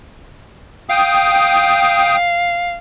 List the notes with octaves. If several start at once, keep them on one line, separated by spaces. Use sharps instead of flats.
F5 G5 D#6